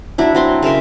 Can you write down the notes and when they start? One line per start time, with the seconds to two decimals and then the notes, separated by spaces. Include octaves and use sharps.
0.18 F#3 D4 E4
0.35 F#3 C4 C6
0.63 C#3 A#4 E5 C6